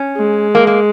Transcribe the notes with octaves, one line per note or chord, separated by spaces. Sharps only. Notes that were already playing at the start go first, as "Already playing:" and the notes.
Already playing: C#4
G#3
A#3
A#3